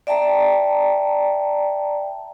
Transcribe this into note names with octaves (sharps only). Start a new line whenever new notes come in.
D5 E5 G5 A5 A#5